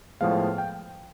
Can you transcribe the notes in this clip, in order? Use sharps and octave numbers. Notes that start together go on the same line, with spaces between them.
A2 F3 G#3 B3 F5
G5